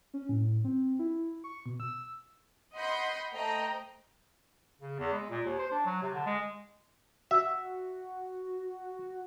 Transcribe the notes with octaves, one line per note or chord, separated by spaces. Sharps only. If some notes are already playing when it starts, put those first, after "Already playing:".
C#4
A2
C4
E4
C#6
B2
E6
D#5 F#5 B5 C6 G6
A3 C5 D#5 G5 A#5
C#3
E2
G#3
A#2
D#2
C5
D4
F#3
C3
D3
G#3
F#4 E5